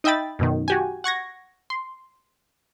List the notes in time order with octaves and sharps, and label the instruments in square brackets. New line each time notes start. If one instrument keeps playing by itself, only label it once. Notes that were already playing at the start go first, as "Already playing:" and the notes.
[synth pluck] D#4 D#5 E5 G5 B5 A6
F#2 B2 D#3
F#4 G4 G#5
F#5 C#6 G#6 A#6
C6